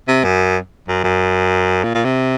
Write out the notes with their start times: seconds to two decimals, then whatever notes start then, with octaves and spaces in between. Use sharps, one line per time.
0.08 C3
0.24 F#2
0.88 F#2
1.04 F#2
1.84 A#2
1.95 A#2
2.05 C3